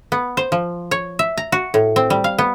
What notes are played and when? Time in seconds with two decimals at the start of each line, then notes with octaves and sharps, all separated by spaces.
0.12 B3
0.37 C5
0.52 F3
0.91 C#5
1.19 E5
1.37 A#5
1.52 F#4
1.74 A2
1.96 C4
2.10 G3
2.24 F5
2.39 B3